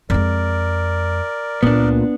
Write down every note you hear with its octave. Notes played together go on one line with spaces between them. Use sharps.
F2 G#3 A#4 D5
C#2 A#2 B3 D4